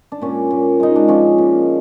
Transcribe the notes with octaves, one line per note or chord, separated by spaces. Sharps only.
D4
A#2 C#4
A#2
G#3 D#4
D4
F3 C#4
A#2